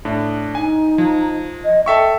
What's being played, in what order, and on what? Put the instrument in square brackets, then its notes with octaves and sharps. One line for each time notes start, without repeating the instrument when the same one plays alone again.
[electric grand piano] A2 D4
[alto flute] D#4 [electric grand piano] G#5
[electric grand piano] F3
[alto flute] D#5
[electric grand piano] A4 E5 C#6 [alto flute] G5